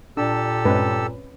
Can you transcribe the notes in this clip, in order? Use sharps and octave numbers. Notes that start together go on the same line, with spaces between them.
A#2 D4 G4 A4 E6
G2 G#3 C4 C#4 B4